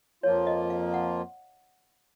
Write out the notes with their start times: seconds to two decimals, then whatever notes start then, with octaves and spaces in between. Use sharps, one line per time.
0.23 F2 F3 A#3 F4 C#5
0.47 D#5
0.70 F5
0.94 F#5